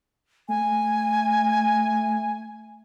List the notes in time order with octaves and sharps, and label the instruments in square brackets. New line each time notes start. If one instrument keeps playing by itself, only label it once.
[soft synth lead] A3 [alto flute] G#5